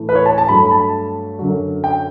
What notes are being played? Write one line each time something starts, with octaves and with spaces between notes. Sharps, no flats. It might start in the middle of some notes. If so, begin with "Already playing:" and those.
Already playing: A2 E3 A3
B4
C#5
A5
A5
G2 F#3 A3 B5
B5
A5
F#2 D3 F#3
G5